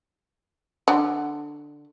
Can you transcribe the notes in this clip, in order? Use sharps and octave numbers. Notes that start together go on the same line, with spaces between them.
D3